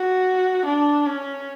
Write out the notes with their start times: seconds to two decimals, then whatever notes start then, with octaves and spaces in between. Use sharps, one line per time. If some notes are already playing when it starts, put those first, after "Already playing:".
Already playing: F#4
0.65 D4
1.07 C#4